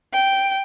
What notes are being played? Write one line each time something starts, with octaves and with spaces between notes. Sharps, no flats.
G5